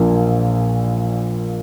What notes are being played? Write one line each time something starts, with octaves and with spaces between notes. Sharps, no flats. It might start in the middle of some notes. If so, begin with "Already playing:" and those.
Already playing: A#1 A#2 A#3